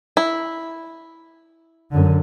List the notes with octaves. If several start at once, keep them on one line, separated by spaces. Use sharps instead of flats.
E4
F#2 D3